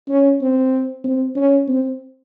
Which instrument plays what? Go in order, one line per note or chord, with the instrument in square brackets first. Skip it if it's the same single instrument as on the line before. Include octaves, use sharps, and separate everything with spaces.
[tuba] C#4
C4
C4
C#4
C4